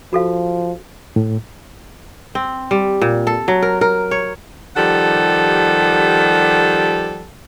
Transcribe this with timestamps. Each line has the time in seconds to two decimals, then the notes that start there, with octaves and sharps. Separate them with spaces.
0.13 F3 F#4 A4 F5
1.16 A2
2.35 C4
2.71 G3
3.01 A#2
3.27 A4
3.48 F#3
3.62 A#4
3.81 A#4
4.11 C#5
4.77 D#3 F3 G3 G4 A4 F#5